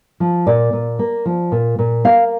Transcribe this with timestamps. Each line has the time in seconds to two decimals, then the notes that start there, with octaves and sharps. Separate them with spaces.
0.20 F3
0.47 A#2 D5
0.73 A#2
0.99 A#3
1.26 F3
1.52 A#2
1.79 A#2
2.04 A#3 F5